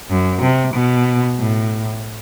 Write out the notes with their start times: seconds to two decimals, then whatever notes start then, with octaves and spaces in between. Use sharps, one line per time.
0.10 F#2
0.42 C3
0.74 B2
1.39 A2